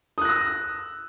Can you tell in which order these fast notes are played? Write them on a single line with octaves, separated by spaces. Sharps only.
D#6 F#6 A#6 E6